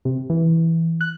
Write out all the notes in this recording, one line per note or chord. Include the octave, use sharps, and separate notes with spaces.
C3
E3
F#6